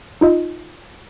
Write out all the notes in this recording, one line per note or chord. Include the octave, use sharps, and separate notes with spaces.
D#4 F4 D#5